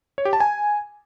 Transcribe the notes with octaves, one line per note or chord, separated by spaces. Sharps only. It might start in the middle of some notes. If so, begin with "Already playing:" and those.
C#5
G4
A5
G#5